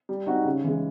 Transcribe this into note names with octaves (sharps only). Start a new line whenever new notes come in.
G3
C4 D#4 F#4
C#3
E3 G#3